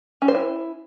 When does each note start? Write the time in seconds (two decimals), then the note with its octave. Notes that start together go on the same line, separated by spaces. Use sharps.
0.22 C#4
0.28 C5
0.35 E4